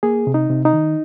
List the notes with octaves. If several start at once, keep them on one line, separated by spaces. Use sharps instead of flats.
A#3 G#4
C3
D#4
C3
D#4
D#3